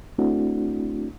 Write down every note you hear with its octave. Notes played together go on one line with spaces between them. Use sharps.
A3 C4 D4 E4 F#4